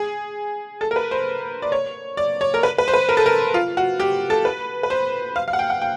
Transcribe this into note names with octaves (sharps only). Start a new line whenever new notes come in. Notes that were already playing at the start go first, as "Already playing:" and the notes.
Already playing: G#4
A4
A#4
B4
C5
D5
C#5
D5
C#5
A#4
B4
B4
C5
B4
A#4
A4
A#4
F4
F#4
G4
A4
B4
B4
C5
F5
F5
F#5
G5
F#5
G5